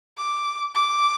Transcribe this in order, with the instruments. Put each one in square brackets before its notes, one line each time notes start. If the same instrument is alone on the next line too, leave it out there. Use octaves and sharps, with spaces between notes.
[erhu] D6
D6